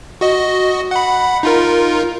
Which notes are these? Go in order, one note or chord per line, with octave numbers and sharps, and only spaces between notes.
F#4 D#5
F#5 B5
D#4 F4 A#4